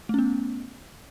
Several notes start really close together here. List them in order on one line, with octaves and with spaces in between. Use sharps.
A3 C#4 B3